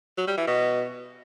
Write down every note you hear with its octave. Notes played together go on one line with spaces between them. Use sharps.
F#3
G3
E3
B2